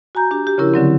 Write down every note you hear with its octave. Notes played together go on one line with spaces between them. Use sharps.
F#4 G#5 A#5 G6
D4 G4
G4
C#3 F3 C#4 E4 A#4
D3 F#3 C4